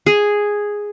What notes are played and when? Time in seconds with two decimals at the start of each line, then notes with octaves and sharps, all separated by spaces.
0.06 G#4